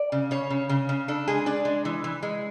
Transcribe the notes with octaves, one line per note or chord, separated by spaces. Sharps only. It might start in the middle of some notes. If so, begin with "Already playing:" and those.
Already playing: D5
C#3
C#3 C#5
C#3
C#3
C#3
D4 A4
G#3 G#4
D4 D5
G#3
E3
E3
G#3